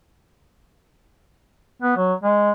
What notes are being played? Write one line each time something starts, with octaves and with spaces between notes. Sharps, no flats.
B3
F#3
G#3